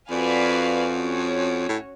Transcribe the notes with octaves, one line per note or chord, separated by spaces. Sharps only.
F2 F#4 B4 D5 F5 G#5
C#4 F#4 C#5
A2